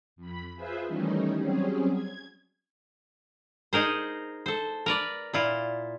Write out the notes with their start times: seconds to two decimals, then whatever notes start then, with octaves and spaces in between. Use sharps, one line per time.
0.16 F2 B5
0.55 F4 G#4 B4 C5 E5
0.86 D#3 E3 G3 A3 C#4 D#4
1.36 F#3 G3 C4 C#4 G#4
1.91 G#6
3.73 D#4 G#4 A#4 C5
4.46 A4 C5
4.86 A#4 B4 D5
5.33 A#2 E4 F4